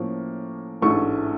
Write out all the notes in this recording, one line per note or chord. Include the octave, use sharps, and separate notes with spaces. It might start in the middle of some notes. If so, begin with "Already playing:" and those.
Already playing: A2 F3 A#3 C#4
A1 G#2 E3 A3 D4 C#6